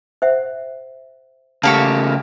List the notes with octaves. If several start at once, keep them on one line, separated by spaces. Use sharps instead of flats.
C5 E5 F#5
C#3 A3 A#3 G4 F#5 A5 C#6